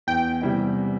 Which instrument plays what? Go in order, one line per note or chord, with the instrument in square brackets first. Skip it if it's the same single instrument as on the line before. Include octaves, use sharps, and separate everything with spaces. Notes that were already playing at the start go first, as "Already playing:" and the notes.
[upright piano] E2 [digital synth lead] G5
[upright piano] C3 G3 E4